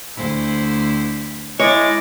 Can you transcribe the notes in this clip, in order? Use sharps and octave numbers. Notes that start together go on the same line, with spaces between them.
D2 E4 C5
G#3 E4 C#5 D6 A6